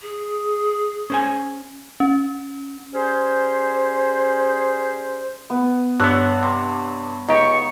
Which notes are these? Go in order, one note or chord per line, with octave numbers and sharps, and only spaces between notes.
G#4
C#4 C5 G#5
C#4
G3 C#4 G#4 C5
B3
G2 D3 B3 C#5 E6 F#6
C3
C#2 D#4 G4 C#6